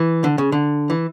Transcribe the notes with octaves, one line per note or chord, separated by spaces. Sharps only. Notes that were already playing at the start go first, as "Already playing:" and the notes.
Already playing: E3
D3
C#3
D3
E3